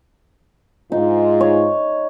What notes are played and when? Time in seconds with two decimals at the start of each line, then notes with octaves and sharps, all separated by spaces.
0.92 G#2 D#4 F4
1.41 C#5